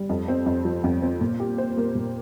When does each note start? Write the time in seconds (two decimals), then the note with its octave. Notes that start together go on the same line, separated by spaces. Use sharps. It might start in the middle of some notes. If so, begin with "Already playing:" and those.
Already playing: G3
0.09 F2
0.28 C4
0.46 F2
0.65 F3
0.84 F2
1.02 C4
1.21 A#2
1.40 G4
1.58 C5
1.77 A#3
1.95 A#2